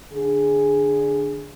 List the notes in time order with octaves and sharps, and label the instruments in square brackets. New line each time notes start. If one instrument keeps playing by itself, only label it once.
[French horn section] D3 G#4